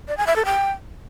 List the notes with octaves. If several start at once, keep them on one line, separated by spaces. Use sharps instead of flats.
D5
G#5
E5
A4
G5